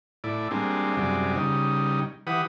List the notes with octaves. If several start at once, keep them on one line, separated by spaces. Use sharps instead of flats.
A2 E4 D5
G3 G#3 A#3 C4 D4
F#2 C3 G3 G#3 D5
C#3 G3 D#4
E3 G4 B4 F#5 D#6